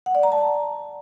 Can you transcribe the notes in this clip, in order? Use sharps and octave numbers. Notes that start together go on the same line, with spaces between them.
F#5
D5
A#5
A5